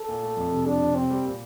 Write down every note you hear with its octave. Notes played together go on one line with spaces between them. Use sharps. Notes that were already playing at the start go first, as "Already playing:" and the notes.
Already playing: A4
A#2
A3
F2
C3
F2 D4
C3
C3 C4
G3
A#2